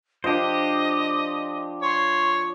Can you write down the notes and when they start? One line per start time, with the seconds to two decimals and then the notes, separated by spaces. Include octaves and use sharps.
0.24 F3 D4 G4 C5 D#5
1.83 C#5 C6